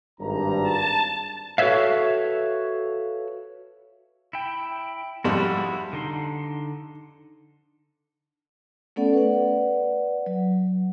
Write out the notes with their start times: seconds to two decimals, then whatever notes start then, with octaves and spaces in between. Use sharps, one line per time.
0.20 G#1 G2 A#5
0.62 A5
1.58 F#4 A4 B4 C#5 E5 F5
4.33 E4 G5
5.24 F2 G#2 G3 E4 F#4 F#5
5.93 D3 D#4 C6
8.96 A3 B3 C#4 A4 D5 F#5
9.13 B4 D5 F#5
10.26 F#3